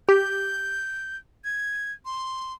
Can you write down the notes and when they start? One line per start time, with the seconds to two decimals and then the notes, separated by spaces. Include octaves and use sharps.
0.09 G4 G6
1.45 G#6
2.05 C6